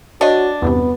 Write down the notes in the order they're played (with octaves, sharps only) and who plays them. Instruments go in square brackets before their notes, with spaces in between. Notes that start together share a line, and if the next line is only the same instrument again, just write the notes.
[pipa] D4 [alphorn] F#4 [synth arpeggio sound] C#5 D#5
[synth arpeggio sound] E2 G2 C3 [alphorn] B3